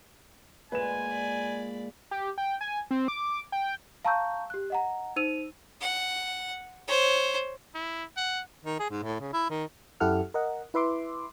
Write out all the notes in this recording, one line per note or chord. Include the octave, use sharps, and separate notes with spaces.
A#2 G#3 B4 D5 G#5 E7
D5 B5
G4
G5
G#5
C4
D6
G5
F5 A5 A#5 C#6 E6 G6
G4 F#6
D#5 F#5 A#5
D#4 C5 E6 D#7 F7
F#5
C5 C#5
E4
F#5
D#3
G#4
G#2
A2
C#3
E4
D#3
F#2 E4 G4 A4 F#5 F6
A#4 D#5 F#5
E4 B4 E5 C6 D6